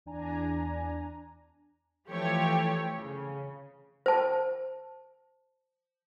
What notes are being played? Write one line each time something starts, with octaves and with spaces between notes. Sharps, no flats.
E2 D4 G#5 A#5
E3 F3 A3 G4 C#5
C#3
C5 A5